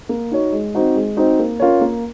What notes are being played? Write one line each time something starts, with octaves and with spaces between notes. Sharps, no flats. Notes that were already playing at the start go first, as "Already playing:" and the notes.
A#3
D#4 F#4 C#5
G#3
C4 D#4 F#4 C5
G#3
C4 D#4 F#4 C5
A#3
C#4 F4 A#4 C#5
A#3